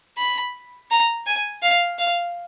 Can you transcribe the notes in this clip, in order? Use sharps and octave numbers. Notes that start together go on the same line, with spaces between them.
B5
A#5
G#5
F5
F5